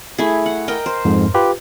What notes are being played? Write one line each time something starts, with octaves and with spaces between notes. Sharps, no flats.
A3 E4 G#4
F#5
A#4 D#5 G5
C5
F2 G#2
F4 G4 B4